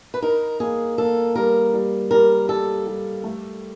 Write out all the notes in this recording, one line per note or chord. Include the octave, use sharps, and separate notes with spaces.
B4
D#4 A#4
A#3 G#4
A#3 A4
G3 A#4
G3
G3 A#4
G3 A4
G3
A3